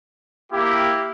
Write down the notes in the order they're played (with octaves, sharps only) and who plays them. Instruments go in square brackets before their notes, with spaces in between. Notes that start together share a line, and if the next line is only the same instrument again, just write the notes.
[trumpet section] A#3 E4 G4